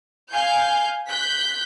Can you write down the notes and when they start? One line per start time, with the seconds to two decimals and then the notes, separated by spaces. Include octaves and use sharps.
0.32 F5 G#5 G6 C7
1.09 F#6 G6 B6